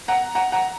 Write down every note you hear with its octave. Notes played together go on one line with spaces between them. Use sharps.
F#5 A#5
F#5 A#5
F#5 A#5